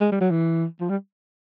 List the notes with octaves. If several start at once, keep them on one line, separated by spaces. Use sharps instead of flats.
G#3
G3
F#3
E3
F3
G3